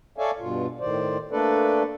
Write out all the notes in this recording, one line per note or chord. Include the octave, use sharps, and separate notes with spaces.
A4 C#5 D5 E5 F5 G#5
G2 B2 F4
A2 D#3 C5 D5
A3 A#3 D4 A4 B4 D5